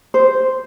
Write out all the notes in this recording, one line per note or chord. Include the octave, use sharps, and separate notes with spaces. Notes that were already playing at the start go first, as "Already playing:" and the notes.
C5